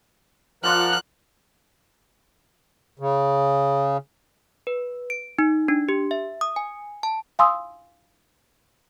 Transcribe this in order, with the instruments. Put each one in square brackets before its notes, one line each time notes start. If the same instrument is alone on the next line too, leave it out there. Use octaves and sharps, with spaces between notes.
[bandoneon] F3 F6 [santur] F4 D5 C6 [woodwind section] A#4 F#5 [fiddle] F#6
[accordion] C#3
[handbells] B4
D7
D#4
D4
G4
E5
D#6
G#5
A5
[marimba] F5 G#5 C6 D#6 E6